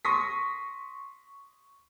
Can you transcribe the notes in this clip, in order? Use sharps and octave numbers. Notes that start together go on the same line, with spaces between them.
C6 C#6 D#6 A#6 B6